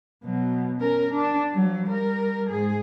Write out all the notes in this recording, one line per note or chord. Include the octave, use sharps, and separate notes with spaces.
B2 F#3
C#4 A#4
D4
F3 F#3
G3 A#4
G#2 G#4